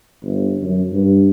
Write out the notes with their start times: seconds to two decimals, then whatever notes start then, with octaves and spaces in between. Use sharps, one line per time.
0.23 G1
0.62 F#2
0.93 G2